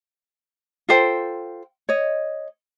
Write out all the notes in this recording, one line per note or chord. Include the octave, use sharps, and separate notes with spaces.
F4 A4 C5 G5
C#5 D#5